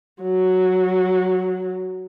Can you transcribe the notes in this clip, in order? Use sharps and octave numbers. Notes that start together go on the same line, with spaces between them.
F#3